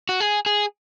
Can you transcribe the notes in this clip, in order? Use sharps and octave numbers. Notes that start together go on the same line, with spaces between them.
F#4
G#4
G#4